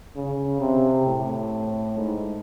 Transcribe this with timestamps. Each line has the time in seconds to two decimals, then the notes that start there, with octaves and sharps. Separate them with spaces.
0.16 C#3
0.61 C3
1.06 A2
1.98 G#2